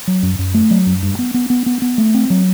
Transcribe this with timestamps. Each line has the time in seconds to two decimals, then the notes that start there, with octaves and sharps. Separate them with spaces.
0.07 F#3
0.23 F#2
0.39 F#2
0.54 A3
0.70 F#3
0.86 F#2
1.03 G2
1.19 B3
1.34 B3
1.50 B3
1.66 B3
1.82 B3
1.98 A3
2.14 C4
2.30 F#3